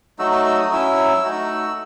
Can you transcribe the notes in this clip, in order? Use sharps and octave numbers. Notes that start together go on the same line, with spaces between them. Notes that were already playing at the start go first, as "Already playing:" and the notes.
F#3 A3 D#4 F#4 E6
E6
E6
D#6
F#3 C#4 E4 E6
A3 D#4 F#4